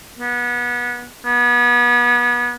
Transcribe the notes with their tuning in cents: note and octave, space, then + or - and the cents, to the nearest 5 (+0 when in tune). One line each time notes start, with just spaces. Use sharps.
B3 -25
B3 -30